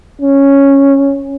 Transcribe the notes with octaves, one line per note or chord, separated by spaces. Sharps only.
C#4